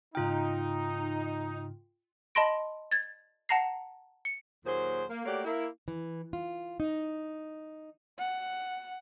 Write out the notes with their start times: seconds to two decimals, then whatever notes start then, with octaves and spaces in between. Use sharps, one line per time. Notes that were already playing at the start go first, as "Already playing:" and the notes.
0.15 G#2 C#3 D#4 F4 G5 F6
2.35 D#5 A5 B5 C6 A#6 D7
2.91 G#6 A6
3.49 F#5 A5 A#5 A#6 C7
4.25 C#7
4.65 D#2 A#2 F#3 G#4 C5
5.10 A#3
5.25 A3 A#3 F#4 G4 C#5 D5
5.45 A#3 E4
5.88 E3
6.33 F4
6.80 D#4
8.18 F#5